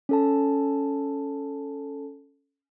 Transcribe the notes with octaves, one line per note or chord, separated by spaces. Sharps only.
C#4 A4 A5